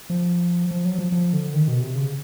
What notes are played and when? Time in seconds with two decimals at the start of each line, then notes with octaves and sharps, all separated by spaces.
0.10 F3
0.71 F3
0.85 F#3
0.98 F3
1.12 F3
1.33 D3
1.54 D#3
1.68 B2
1.81 C3
1.95 C#3